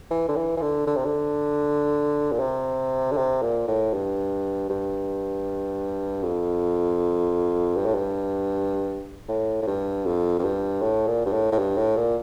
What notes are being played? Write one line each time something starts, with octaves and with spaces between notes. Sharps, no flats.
E3
D3
E3
E3
D3
D3
C3
D3
A#2
C3
D3
C3
A#2
A2
G2
G2
F2
G2
A2
G2
A2
A2
G2
F2
F2
G2
A2
A#2
G2
A2
A2
G2
A2
A#2